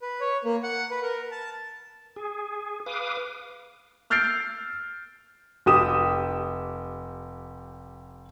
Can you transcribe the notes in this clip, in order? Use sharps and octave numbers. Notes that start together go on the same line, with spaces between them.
B4
C#5
A#3
F#5
B4
A#4
A5
G#4
B4 F5 D6 D#6
E6 F6 G6 A6 C7 D7
F1 G4 D#6 E7